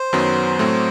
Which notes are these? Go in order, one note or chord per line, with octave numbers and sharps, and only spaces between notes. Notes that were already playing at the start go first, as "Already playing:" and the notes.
Already playing: C5
F#2 D#3 F#3 B3
A2 F#3 A3 C4